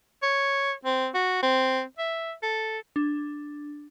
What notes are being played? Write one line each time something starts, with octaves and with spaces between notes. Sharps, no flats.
C#5
C4
F#4
C4
E5
A4
D4